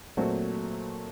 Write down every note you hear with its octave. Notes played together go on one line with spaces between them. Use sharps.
A#2 F#3 A3 C4 F#4